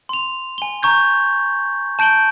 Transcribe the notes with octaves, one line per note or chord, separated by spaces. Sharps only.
C6 F7
G#5 G7
A#5 C#6 G6 G#6
A5 G6 D7 F#7 G7